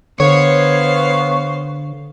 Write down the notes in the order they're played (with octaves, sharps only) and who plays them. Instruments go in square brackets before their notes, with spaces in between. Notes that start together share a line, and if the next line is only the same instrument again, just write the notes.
[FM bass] D3 [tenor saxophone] B3 [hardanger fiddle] C5 F5 [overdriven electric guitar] C#5